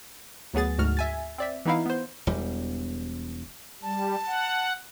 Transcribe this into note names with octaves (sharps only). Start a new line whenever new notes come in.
D2 F#3 B3 G#4 A6
D2 G#2 F#4 F6
E5 G#5 A6
C4 D5 E5
E3 B3 D#4 E4 F5
B3 C5
E1 E2 G3
G3 A5
F#5